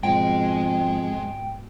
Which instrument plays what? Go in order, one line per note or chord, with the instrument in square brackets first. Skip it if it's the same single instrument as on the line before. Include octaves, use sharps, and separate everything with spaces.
[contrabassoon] F2 [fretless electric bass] G#2 B2 [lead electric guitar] G#3 [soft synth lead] G5